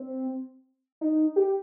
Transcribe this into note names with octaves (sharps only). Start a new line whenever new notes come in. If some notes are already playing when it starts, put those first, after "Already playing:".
Already playing: C4
D#4
G4